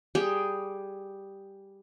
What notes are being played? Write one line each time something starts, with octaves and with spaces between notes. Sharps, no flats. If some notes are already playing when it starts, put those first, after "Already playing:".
G3 G4 G#4 G5